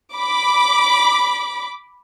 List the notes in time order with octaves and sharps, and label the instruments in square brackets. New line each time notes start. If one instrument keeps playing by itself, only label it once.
[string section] B5 D6